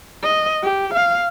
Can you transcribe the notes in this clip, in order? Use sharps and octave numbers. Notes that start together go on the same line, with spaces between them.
D#5
G4
F5